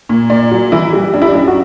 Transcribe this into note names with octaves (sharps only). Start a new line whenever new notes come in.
A#2
A#2 D5
F#3
E3 E4
G3
F#2 D4
E4
D4
F#2
F#4